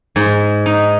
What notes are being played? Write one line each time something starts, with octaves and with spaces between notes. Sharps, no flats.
G#2
D#4